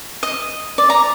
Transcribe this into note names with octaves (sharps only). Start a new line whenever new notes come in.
D#5
D5
A#5